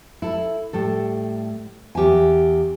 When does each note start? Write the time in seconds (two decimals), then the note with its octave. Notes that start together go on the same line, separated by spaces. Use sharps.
0.22 E4 A4
0.73 A2 G3 A4
1.95 E2 G4 E5 G#5